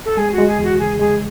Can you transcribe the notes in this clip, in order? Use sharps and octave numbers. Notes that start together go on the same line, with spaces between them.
A4
G#3 G#4
F#4
G#3
G#4
E2 F#4
C#3 G#4
G#3 G#4